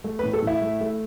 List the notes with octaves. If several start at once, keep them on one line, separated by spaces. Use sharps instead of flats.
A3
B4
A2
A4
A2 E4
A3
A3